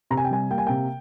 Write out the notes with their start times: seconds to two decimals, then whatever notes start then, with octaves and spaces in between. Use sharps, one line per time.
0.11 C3 A#5
0.17 G#5
0.25 G5
0.31 G3 G#5
0.51 A#3 G5
0.58 G#5
0.67 C3 G5